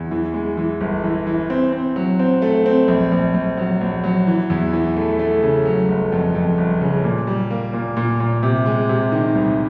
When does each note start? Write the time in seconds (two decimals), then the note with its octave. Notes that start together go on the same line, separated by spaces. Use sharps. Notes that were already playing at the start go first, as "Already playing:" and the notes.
Already playing: E2
0.11 E3
0.34 G#3
0.57 E3
0.80 G1
1.04 E3
1.27 E3
1.50 C4
1.72 C4
1.96 F#3
2.19 C4
2.42 A3
2.66 C4
2.88 A#1
3.12 A#1
3.34 A#1
3.57 F#3
3.81 A#1
4.04 F#3
4.27 E3
4.50 E2
4.73 E3
4.97 A3
5.19 A3
5.43 C#3
5.66 F#3
5.89 G1
6.12 F2
6.35 F2
6.58 G1
6.81 C#3
7.04 A#2
7.27 G3
7.50 A#3
7.73 A#2
7.97 A#2
8.20 A#2
8.43 C3
8.66 G#3
8.89 C3
9.12 D#3
9.35 C2